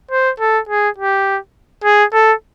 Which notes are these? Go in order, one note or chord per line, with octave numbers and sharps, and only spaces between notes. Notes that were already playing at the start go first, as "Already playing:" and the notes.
C5
A4
G#4
G4
G#4
A4